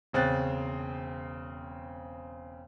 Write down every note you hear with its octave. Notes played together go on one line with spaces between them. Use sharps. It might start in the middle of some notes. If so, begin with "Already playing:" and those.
E1 C#3 C4 F#6 A6